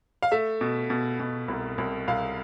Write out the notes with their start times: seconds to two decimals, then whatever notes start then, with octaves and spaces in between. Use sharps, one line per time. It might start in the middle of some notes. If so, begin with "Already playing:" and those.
0.23 F5
0.32 A3 E5
0.61 B2
0.90 B2
1.20 B2
1.48 C2
1.78 C2
2.08 C2 F5